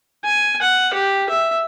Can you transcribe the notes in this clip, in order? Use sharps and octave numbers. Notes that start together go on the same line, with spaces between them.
G#5
F#5
G4
E5